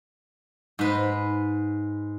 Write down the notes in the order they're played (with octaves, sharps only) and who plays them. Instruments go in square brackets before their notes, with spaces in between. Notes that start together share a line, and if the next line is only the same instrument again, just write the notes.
[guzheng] G#2 B4